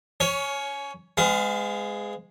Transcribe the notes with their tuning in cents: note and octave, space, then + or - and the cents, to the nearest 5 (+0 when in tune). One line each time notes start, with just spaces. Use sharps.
C#4 +20 C#5 +0
G#3 -5 B3 +45 F5 +0